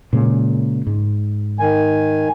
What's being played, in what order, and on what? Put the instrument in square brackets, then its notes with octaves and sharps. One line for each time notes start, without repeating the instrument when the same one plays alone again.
[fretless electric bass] A#2 C#3 G#3
G#2
[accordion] D#3 G#5